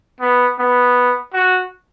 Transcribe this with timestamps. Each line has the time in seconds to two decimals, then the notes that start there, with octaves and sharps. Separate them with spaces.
0.20 B3
0.59 B3
1.33 F#4